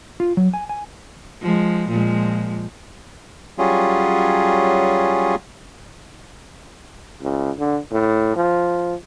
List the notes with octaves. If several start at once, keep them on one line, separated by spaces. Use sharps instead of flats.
F4
F#3
G#5
G#5
F3 G#3
A#2 F3 G#3
F#3 G3 C#4 F4 G#4
C#2
D3
A2
F3